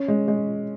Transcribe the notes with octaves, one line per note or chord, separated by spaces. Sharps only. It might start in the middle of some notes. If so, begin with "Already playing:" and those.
Already playing: C#4
G#3
G#3